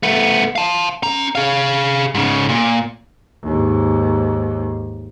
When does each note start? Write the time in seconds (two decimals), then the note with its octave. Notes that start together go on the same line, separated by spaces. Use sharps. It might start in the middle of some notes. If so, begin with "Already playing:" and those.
0.03 A3 B3
0.56 F5 A5
1.03 C#4 A#5
1.35 G#4 F5
2.14 G#2 C#3
2.49 A#2
3.44 D#2 G#2